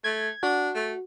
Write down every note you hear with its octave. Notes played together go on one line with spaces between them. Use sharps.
A3 G#6
D4 F#4
A3